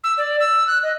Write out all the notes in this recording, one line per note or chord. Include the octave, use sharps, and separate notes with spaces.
E6
D5
E6
F#6
D#5